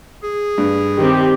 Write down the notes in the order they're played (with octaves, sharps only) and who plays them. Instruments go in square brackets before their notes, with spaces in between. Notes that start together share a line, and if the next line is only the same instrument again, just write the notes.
[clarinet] G#4
[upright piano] G2
[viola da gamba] D#3 C4 [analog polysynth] G4